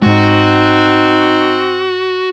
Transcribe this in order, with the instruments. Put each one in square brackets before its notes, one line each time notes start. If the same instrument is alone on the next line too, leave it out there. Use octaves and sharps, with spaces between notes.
[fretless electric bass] G#2 G#3 [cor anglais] C4 [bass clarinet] D#4 [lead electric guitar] F#4